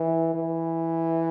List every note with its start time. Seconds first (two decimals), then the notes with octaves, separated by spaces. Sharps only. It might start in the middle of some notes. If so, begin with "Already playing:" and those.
Already playing: E3
0.34 E3